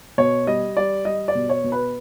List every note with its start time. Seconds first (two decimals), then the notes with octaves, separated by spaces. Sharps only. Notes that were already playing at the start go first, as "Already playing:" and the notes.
0.18 B2 C#5
0.47 G3 D#5
0.77 G3 D5
1.05 G3 D#5
1.28 D5
1.35 B2
1.49 C#5
1.64 B2
1.72 B4